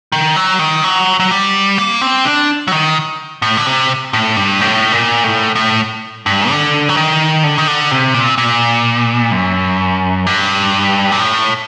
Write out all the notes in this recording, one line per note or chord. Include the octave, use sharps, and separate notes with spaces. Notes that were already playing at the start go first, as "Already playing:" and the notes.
D#3
F#3
D#3
F#3
F#3
G3
A#3
C4
D4
F#3
D#3
A2
D3
C3
A2
G2
A2
A#2
A2
A2
G2
D3
F#3
D#3
D3
D#3
D3
C3
A#2
A#2
F#2
G2
A#2
A2